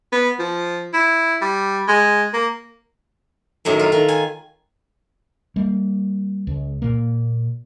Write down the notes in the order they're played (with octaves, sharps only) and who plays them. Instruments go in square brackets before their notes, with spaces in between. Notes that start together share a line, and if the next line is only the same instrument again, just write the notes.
[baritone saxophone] B3
F3
E4
G3
G#3
A#3
[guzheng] F#2 A2 D#3
F4
D#3
G#5
[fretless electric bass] G3 A#3
C#2
A#2 A#3